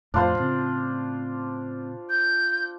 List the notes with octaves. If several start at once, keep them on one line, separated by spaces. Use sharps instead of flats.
F2 A2 D4 F4 C5
A2 C#3 C4
G6